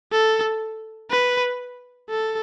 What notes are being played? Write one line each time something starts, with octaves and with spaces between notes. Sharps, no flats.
A4
B4
A4